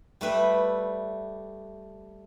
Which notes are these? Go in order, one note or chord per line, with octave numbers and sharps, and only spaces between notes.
G3 A3 B4 E5